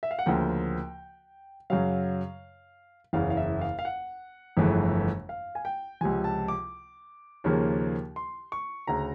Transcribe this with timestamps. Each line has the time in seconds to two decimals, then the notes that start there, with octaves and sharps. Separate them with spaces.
0.03 E5
0.11 F5
0.19 F#5
0.26 D2 C#3 F3 A#3 G5
1.70 F#2 C#3 F#3 F5
3.13 F#1 E2 C#3 F5
3.30 F5
3.37 E5
3.61 F5
3.79 F5
3.85 F#5
4.57 G1 F2 C#3 E3 A3
5.29 F5
5.55 G#5
5.65 G5
6.01 C#2 C3 F3 G#5
6.24 A5
6.48 D6
7.44 D#2 C#3 F3 A#3
8.16 C6
8.52 C#6
8.87 D2 C#3 A#5